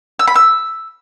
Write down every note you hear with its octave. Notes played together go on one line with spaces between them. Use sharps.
E6
B5
E6